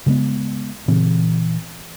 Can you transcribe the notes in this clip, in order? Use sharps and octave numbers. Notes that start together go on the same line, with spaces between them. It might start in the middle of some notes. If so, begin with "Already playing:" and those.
C#3 G#3 A#3 B3
A#2 C#3 E3 C4